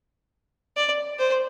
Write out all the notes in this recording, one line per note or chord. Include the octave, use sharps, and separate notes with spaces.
D5
C5